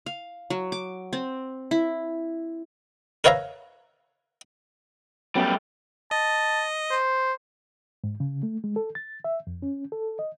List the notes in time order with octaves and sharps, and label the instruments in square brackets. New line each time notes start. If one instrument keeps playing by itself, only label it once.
[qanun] F5
F#3
D6
C4
E4
[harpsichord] A#4 B4 C#5 E5 F5 A#5
[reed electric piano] F#3 B3 C#4 [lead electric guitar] G3 A3
[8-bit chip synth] D#5 [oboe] A5
[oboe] C5
[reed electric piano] G#2
C#3
A3
G#3
A4
A6
E5
F2
C#4
A4
D#5